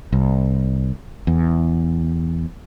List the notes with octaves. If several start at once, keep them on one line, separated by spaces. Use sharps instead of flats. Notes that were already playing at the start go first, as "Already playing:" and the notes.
C2
E2